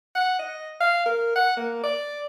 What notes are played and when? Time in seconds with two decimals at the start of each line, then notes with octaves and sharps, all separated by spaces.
0.15 F#5
0.39 D#5
0.80 F5
1.06 A#4
1.36 F#5
1.57 A#3
1.84 D5